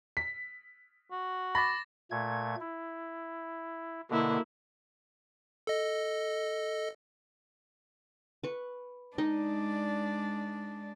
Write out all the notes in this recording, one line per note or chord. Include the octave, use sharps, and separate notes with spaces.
B6
F#4
B5 D6 A6 A#6
A#2 A3 G#6
E4
B2 D3 A#3 E4
A4 D#5
B4 C#6
G#3 D4 D#4 D5 D#5